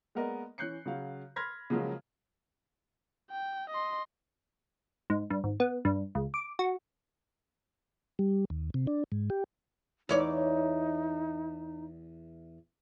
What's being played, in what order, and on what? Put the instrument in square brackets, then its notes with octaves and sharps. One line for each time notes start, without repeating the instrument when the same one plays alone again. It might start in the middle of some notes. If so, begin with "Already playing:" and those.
[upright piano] G#3 A#3 B3 A#4 D5 D#5
E3 C#4 F#6 G6 C7 C#7
C#3 F#3 F5
B5 C6 F6 G#6 A#6 B6
C#3 F3 F#3 G#3 A#3 C#4
[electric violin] G5
D#5 C6
[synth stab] G#2
G2
G#1
B3
G2
C#2
D6
F#4
[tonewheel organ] G3
D#2
C3
D4
G#2
G4
[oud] E2 C#5 D5 [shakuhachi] D#4